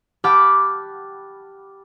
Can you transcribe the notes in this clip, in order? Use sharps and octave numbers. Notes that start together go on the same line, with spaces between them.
G4 F#5 A5 B5 D6 F6